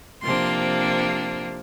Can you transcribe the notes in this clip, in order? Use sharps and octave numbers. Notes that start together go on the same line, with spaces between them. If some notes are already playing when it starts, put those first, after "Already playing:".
C3 F3 A#3 D4 C6